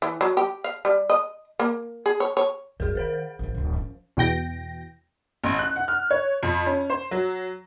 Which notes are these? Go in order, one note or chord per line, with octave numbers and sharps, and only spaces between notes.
E3
F#3
G4
F5
G3
D#5
A#3
G#4
C#5
C#5
F#2 F#3 G#4 A#4
D#3 A#4 C5 F5
A1 E3
D1 A#1
F3 C#4
E2 B2 G5 A#6
A1
F#6
F#5
F6
C#5
F2
C#4
C5
F#3